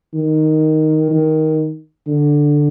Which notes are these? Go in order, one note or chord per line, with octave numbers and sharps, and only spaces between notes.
D#3
D#3
D3